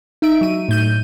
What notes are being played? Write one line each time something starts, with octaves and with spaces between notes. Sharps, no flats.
D#4 E5 D7
F#3 D#7
A2 G6 D#7